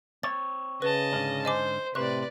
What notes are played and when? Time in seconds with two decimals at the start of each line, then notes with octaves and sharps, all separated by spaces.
0.23 C4 C#5 A6
0.82 C#3 B4 D#5 A5
1.13 G#2 D3 C#4
1.45 C5 D#5 G#5 D6
1.95 A2 C3 B4 C5 D5 F#6